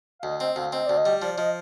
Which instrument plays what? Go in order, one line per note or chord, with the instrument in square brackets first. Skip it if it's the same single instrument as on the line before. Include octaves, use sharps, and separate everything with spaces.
[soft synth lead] F5
[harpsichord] D2 [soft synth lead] D#5
[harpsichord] C4 [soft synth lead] D#5
[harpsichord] D2 [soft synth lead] F5
[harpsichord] C4 [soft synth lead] D#5
[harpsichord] D2 [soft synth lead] D5
[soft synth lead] D#5
[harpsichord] G3
[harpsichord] F3 [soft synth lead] D5
[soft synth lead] D5
[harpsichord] F3 [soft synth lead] D#5